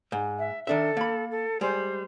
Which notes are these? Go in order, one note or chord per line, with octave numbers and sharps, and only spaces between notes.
G#2
E5
D#3 D4 A4 E5
A#3 B5
A4
G3 G#3 C5